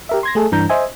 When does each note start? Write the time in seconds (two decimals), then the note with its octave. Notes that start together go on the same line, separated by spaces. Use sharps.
0.09 G4 A#4 E5
0.23 C6 G#6 A#6
0.35 A3 G#4 A4
0.52 G2 E3 D4 A#5 G6
0.69 C5 D#5 E5 G#5